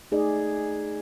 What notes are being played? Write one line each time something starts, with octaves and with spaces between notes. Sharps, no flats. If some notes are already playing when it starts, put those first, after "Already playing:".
A3 D#4 G#4 D5 D#5